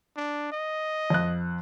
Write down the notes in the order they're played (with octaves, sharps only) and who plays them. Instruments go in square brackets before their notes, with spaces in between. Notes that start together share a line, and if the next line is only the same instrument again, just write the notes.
[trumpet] D4
D#5
[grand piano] F2 F#6